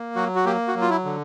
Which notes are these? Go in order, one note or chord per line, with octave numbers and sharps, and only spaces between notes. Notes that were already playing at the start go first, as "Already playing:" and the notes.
Already playing: A#3
F#3 F#4
F#4
A#3 G4
F#4
F#3
F4
E4
D3